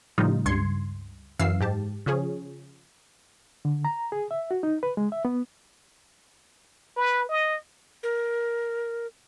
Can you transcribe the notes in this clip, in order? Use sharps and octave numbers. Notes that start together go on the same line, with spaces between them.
A2 C#3 F3 G3 D#4 F4
C#2 G2 C6 G#6 C#7
F#2 E3 F5 E6 C7
G#2 G4 A5
C#3 F3 C#4 G#4
D3
A#5
G#4
E5
F#4
D#4
B4
G#3
E5
B3
B4
D#5
A#4